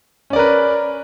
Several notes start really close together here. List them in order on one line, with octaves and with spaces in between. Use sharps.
C#4 D5 A#4 B4